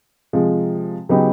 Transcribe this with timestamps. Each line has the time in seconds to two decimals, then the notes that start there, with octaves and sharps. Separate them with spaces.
0.33 C3 F3 G#3
1.09 C#3 F#3 B3 D#4 G4